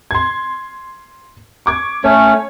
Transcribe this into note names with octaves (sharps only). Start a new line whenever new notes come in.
C6 G#6
C#6 D6 G#6
A3 C#4 C#5